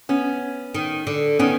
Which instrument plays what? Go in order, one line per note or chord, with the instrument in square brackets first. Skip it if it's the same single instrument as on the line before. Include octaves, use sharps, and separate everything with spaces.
[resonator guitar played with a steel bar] B3 C#4
[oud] D#3
D3
[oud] D#3 [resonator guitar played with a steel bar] B3 C#4